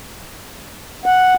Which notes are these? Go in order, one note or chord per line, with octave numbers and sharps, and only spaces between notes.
F#5